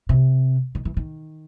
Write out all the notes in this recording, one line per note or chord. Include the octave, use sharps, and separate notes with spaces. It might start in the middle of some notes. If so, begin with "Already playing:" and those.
C3
D#3
E3
D#3